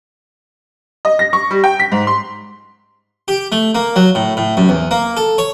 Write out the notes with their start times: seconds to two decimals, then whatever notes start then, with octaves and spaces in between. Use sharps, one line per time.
1.05 D#5
1.19 A#6
1.33 C#6
1.51 G3
1.64 G5
1.80 B6
1.92 G#2
2.07 C6
3.28 G4
3.52 A3
3.75 A#3
3.96 F#3
4.15 A2
4.37 A2
4.57 F#2
4.69 E2
4.91 A#3
5.17 A4
5.38 C#5